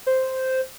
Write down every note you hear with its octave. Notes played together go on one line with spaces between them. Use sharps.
C5